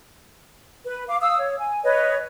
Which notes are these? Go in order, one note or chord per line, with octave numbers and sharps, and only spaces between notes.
B4
F5 D6
F5 D#6 E6
C#5
G#5
B4 C#5 D#5